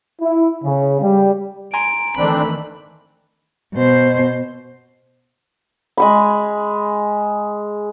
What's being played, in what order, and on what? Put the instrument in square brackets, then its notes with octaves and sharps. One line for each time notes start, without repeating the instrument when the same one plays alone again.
[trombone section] E4
C#3
G3
[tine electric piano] G#5 A#5 C6 [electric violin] D7
[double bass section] D#3 E3 A3 [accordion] C4 D4 [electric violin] B5
[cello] B2 C5
[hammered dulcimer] G#3 G#5 B5